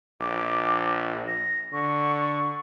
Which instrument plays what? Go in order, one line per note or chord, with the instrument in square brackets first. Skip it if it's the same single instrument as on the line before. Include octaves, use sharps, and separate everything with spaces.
[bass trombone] A#1 [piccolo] D6
[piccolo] A#6
[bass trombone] D3 [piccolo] C#6